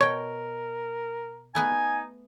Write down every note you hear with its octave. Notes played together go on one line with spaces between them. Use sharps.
B2 A#4 C#5 G5
A3 B3 D#4 G#4 G#5